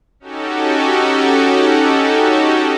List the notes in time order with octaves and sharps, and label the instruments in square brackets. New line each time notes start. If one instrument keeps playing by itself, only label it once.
[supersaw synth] C#4 D#4 F#4 G4 A4